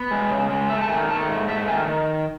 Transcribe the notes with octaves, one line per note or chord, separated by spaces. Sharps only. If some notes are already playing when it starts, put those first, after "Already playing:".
Already playing: B3
G#3
C#3
G#3
A3 E5
A5
D#3 G#5
A3 A5
G#2
A3 E5
D#3 G#5
D#3